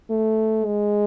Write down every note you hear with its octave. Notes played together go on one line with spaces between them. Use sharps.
A3
G#3